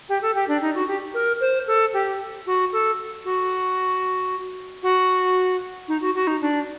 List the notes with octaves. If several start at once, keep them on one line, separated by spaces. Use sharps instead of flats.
G4
A4
G4
D4
D#4
F#4
G4
A#4
C5
A4
G4
F#4
A4
F#4
F#4
D#4
F#4
F#4
D#4
D4